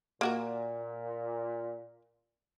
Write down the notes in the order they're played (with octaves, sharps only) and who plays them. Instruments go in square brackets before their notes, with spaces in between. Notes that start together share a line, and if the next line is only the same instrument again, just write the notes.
[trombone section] A#2 [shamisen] A#3 F#4 A#4